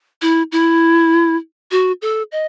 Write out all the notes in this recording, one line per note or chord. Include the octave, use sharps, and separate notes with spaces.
E4
E4
F#4
A4
D#5